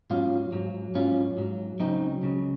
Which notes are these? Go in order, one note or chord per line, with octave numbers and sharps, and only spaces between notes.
G#2 F#3 C#4 F4
G#2 F#3
G#2 F#3 C#4 F4
G#2 F#3
C#2 C#3 F#3 C4 D#4
C#2 C#3 F#3